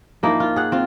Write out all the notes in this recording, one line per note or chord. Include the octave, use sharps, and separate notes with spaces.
F3 A#3 D#4 E4
F4
G#4 F#5
C4 F4